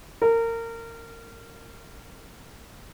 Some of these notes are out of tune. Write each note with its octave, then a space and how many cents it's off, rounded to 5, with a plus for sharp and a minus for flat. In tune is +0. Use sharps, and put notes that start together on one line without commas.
A#4 -25